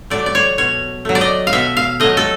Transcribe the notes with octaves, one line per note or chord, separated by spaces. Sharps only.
F#3 A3 D5
D5
C#5
B2 C#5
F#3 A3
D5
D#5
F5
B2 E5
F5
F#3 A3 D#5
A4